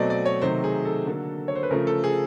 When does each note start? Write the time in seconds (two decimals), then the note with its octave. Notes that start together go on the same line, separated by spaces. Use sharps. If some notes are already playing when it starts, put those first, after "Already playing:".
Already playing: B2 F#3 A3 C4 D5 D#5
0.10 D5
0.26 C#5
0.41 C3 D#3 F#3 A3 C5
0.64 G#4
0.85 A4
1.07 D3 F#3 A#3
1.48 C#5
1.55 C5
1.63 B4
1.70 C#3 F3 A3 A#4
1.87 A4
2.04 G#4